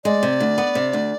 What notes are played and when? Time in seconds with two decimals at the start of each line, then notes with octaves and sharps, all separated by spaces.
0.04 G#3 D5
0.23 C3
0.40 D2
0.58 B3
0.75 C3
0.93 D2